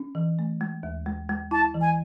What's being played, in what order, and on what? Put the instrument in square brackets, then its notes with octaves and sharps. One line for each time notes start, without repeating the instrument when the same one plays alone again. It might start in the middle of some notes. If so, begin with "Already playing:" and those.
Already playing: [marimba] C#4
E3
A3
G#3
D#2
G#3
G#3
[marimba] E4 [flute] A5
[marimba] E3
[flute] G#5